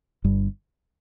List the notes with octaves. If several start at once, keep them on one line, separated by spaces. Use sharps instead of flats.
G1 G2